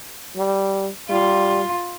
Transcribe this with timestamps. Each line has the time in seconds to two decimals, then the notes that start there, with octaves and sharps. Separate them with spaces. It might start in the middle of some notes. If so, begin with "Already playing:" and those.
0.37 G3
1.10 G3 F4